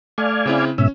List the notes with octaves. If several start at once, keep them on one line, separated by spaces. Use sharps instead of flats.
A3 D5 F5 G#5
C#3 C4 E4
G#2 B2 C#4 E5